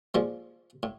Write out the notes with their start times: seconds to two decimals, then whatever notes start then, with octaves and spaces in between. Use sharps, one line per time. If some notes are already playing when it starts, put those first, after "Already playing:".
0.14 A#2 F3 G#3
0.83 A2